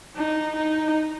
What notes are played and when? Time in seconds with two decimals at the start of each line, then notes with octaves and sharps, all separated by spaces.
0.16 D#4
0.56 D#4